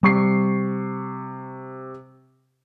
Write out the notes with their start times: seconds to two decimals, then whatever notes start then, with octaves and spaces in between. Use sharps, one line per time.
0.03 C3 G3 C#6 C7